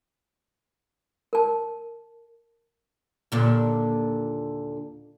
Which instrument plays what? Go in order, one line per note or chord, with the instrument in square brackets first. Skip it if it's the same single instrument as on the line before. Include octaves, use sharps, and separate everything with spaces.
[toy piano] A#4 A5
[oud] D#2 A#2 D3